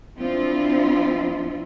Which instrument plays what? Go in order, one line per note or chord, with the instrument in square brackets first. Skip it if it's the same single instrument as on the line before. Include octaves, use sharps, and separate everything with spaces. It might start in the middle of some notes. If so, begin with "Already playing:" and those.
[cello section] F3 C4 D4 E4 F4